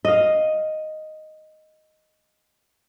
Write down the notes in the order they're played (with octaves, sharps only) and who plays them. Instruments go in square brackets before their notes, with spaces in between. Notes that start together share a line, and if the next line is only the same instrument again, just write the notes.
[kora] D#5 F5